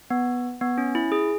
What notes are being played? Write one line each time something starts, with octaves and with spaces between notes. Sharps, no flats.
B3
B3
C#4
E4
G#4